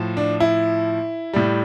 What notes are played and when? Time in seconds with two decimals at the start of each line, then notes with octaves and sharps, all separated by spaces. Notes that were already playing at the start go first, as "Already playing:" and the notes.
Already playing: A2 F3
0.17 D4
0.40 E4
1.33 A2 G3